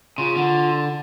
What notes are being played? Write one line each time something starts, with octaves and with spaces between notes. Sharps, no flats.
C#3 F4
D3